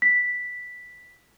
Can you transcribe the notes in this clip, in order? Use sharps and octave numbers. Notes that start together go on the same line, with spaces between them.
B6